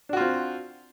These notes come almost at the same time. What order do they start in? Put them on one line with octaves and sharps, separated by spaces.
D4 F#4 F4 C4